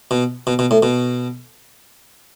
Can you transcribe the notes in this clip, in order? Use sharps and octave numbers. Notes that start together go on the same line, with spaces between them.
B2
B2
B2
A2
B2